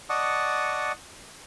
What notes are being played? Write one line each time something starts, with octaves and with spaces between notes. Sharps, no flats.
D5 D#5 F#5 A5 C#6 D#6